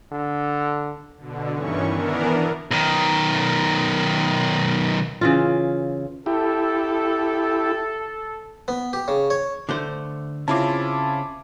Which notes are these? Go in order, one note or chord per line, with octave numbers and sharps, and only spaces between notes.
D3
B2 D3
G2 D#3 E3 C#4 C#6
E3 B3 D4 A#4
B1 D#3
C#3 E3 F4
E4 G4 A4
B3
G4
C#3
C#5
D3 A3 C5
C#3 C4 C#4 E4 F4 A5 D6